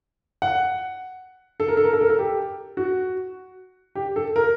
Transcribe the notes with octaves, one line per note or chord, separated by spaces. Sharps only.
F#5
A4
A#4
A4
A#4
A4
A#4
A4
G4
F#4
G4
A4
A#4